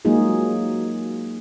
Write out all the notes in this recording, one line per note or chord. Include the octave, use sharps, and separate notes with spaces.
F#3 G#3 A#3 D#4 F4 G#4